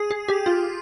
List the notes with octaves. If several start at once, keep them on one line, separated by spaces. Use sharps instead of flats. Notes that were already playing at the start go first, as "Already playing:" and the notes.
Already playing: G#4
G#4
G4
F4